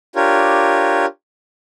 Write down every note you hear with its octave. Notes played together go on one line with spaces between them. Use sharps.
D4 F4 G4 A#4 C#5